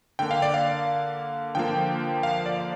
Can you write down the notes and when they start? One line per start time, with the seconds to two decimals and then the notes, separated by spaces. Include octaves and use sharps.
0.19 D3 A#3 G5
0.31 F5
0.42 D5
0.54 F5
1.55 D3 F3 A#3 G5
2.23 F5
2.46 D5